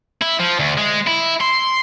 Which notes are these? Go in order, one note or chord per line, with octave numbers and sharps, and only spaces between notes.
E4
F3
D2
G#3
E4
C6